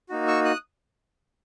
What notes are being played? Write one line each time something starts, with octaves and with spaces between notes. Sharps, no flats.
A#3 D#4 F#4
C#6 E6
D#6 F#6